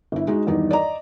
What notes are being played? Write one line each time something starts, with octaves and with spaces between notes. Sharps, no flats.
G1 E4
G#3 D#4 F#4
E2 G2 D#3 D#4
D5 D#5 A#5